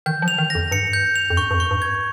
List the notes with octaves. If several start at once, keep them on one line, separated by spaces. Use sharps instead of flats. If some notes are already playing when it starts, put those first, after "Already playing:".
D#3 G6
F3
F7
D#3
F2 A#6
G2 C#7
G6
F7
F2
G2 C#6
G2
F2
C#6
G2
G#6